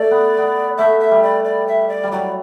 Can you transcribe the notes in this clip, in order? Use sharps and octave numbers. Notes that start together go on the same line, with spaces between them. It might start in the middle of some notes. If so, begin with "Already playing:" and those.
Already playing: A3 D5
B3
B3
A3 E5
E5
G3
D5
D5
E5
D5
G3
F#3 D5